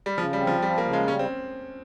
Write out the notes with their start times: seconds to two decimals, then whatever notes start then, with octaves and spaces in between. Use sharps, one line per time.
0.06 G3
0.17 C#3 F3
0.33 G3
0.40 C4
0.47 F3
0.62 F3 G3
0.78 A#3
0.85 C#3
0.93 G#3
1.07 G3 C#4
1.19 C4